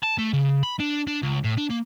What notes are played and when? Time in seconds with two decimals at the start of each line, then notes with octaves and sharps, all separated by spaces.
0.04 A5
0.19 A3
0.33 C#3
0.63 B5
0.80 D4
1.07 D4
1.23 C#2
1.44 A2
1.58 D4
1.70 A#3